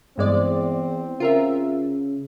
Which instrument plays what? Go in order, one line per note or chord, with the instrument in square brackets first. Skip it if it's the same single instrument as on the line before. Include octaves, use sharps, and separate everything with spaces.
[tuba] E2 [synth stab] G2 G#3 D5 [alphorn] C4
[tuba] C#3 [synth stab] F4 A#4 E5